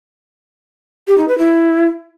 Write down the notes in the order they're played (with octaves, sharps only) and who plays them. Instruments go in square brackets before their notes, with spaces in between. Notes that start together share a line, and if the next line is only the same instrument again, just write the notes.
[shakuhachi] G4
D#4
B4
E4